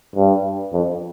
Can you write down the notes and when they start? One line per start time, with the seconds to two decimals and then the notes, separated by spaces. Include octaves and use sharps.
0.16 G2
0.73 F2